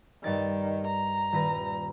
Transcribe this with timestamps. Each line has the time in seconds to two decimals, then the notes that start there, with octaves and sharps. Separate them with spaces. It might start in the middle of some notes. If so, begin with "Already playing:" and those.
0.24 G2 D#3 D5 A6
0.87 A#5
1.32 D#1 B4 A#6